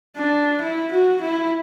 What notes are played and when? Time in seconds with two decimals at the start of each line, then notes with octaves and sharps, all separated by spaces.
0.17 D4
0.61 E4
0.92 F#4
1.21 E4